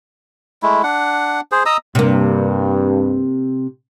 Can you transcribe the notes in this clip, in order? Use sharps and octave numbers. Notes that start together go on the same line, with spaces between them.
G#3 A3 E4
D4 F#5
G#4 C5
D#5 A#5 D#6 E6
G2 C3 A#3